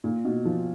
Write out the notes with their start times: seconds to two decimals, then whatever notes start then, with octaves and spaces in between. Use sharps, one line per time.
0.04 A#2
0.25 B2
0.45 F3